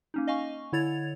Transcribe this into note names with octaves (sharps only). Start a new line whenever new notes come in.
A#3 C#4 D#4
D#5 F5 G#5 C#6
D3 E4 C#5 G#6 A6 F7